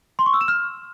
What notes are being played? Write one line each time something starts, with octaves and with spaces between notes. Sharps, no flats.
C6
C#6
E6
E7
F6